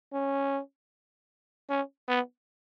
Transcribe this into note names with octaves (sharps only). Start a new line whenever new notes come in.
C#4
C#4
B3